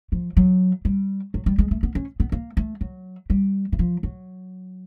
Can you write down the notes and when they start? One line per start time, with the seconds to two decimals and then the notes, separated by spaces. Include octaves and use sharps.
0.12 F3
0.37 F#3
0.85 G3
1.34 F#3
1.46 G3
1.58 G#3
1.71 A3
1.83 B3
1.95 C#4
2.20 B3
2.32 A#3
2.57 A3
2.81 F#3
3.30 G3
3.72 E3
3.79 F3
4.03 F#3